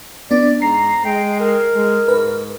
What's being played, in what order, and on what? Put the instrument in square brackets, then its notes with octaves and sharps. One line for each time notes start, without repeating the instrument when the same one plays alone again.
[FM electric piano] B3 D4 [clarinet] D5
[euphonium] G#2 [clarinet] A#5 [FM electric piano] C7
[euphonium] G#3 [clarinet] G5
[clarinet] A#4
[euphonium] G#3
[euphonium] G#2 [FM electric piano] B4